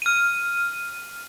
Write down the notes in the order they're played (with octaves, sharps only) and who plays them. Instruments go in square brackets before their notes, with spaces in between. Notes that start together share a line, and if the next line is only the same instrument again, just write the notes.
[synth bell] F6 D#7